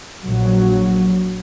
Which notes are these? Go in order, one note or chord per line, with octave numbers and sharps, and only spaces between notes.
A#1 F#3